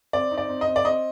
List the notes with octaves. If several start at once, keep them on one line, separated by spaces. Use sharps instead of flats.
C4 D5
D#4
D5
C4
D#5
C4
D5
C4 D#5